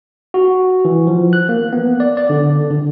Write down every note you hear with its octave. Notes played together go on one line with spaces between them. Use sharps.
F#4
E3
F3
F#6
A#3
B3
D5
D5
D3
D3